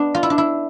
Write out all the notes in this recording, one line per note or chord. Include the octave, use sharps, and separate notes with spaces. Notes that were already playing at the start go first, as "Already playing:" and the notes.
Already playing: B3 D4
F4
E4
D4
E4